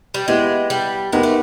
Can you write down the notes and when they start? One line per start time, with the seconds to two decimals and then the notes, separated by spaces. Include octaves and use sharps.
0.14 G3
0.28 G#3 B3 E4 G4
0.70 G3
1.13 G#3 B3 D#4 G4 A#4
1.23 A3